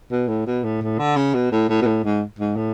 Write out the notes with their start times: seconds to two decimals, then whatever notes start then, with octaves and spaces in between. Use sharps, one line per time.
0.11 B2
0.28 A2
0.46 B2
0.64 A2
0.81 A2
0.98 D3
1.16 C#3
1.34 B2
1.51 A2
1.69 A2
1.81 B2
1.86 A2
2.04 G#2
2.39 G#2
2.56 A2